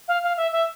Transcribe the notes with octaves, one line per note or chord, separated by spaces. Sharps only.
F5
F5
E5
E5